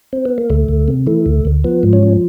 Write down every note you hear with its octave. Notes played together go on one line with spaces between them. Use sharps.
C4
B3
A#3
D2 A3
D2
C3
E3 A3
D2
D2
F3 B3
G#2
C#4
F3